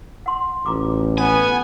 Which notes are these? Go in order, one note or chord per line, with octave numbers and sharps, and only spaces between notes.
F#5 C6
A1 F4 A#5 D6
B3 G#5